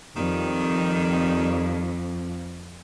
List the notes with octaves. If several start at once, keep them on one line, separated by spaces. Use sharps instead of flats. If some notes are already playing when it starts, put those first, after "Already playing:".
F2 D#3 G3